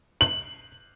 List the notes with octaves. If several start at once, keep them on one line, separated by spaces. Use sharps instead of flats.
F#7